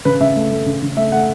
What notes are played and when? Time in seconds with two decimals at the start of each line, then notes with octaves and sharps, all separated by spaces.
0.05 C#3 B4
0.21 C#3 E5
0.36 A3
0.51 A3
0.66 C#3
0.82 C#3
0.97 A3 E5
1.12 A3 F#5